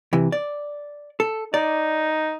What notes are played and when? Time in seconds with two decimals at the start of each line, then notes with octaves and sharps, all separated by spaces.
0.13 C3 E3
0.32 D5
1.20 A4
1.54 D#4 D5